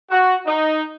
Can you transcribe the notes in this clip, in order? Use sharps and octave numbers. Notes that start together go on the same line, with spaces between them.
F#4
D#4